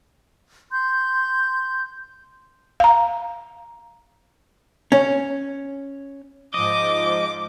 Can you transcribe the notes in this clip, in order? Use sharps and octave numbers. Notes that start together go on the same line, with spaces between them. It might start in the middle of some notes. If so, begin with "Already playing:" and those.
C6 G6
F5 A#5
C#4
G#2 F3 D#5 D6